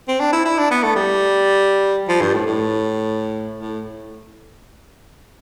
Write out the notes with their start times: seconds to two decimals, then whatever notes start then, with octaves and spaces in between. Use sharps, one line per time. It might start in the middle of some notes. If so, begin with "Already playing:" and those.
0.08 C4
0.20 D4
0.33 E4
0.45 E4
0.58 D4
0.71 B3
0.83 A3
0.96 G3
2.08 F3
2.21 G2
2.34 A2
2.46 A2
3.60 A2